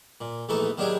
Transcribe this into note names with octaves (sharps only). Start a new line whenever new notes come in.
A#2
A#1 E3 A3 B3 D#4 A4
D#3 F#3 D4 E4 G4 G#4